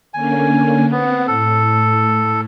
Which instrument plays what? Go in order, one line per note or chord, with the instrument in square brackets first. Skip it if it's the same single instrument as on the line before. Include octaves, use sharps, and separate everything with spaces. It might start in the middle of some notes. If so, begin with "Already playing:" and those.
[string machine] D3 A#3 C#4 [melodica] G#5
[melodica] B3 [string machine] C4 F#5
[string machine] A2 [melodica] A4